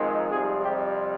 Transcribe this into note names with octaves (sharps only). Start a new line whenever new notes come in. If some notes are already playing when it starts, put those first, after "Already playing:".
Already playing: F2 D#3 G#3 C4
F2 C3 G3 G#4
G4